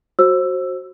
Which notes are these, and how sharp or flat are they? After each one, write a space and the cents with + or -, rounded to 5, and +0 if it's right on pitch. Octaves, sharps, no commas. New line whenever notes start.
F#4 +0 C5 +25 E6 +10